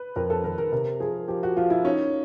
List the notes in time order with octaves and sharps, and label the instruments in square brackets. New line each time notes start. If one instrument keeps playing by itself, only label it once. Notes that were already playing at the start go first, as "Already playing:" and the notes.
Already playing: [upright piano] B4
[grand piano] F2 [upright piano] A#4
[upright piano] A4
[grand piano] D#3 [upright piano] A#4
[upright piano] A#4
[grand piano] C3 [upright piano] A#4
[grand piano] F3 [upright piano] G#4
[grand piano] F3 [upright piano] G4
[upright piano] F#4
[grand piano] F3 [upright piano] F4
[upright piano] E4
[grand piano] C#4 [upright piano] D#4